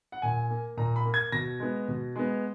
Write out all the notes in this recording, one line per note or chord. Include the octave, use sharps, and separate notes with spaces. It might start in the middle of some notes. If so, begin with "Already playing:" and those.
F#5
A#2 G#5
A#3
A#2 A#5
B5
A#3
G#6
B2 A#6
G#3 B3
B2
G#3 B3